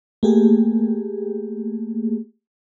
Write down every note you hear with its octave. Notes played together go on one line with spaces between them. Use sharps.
A3 A#3 G4 G#4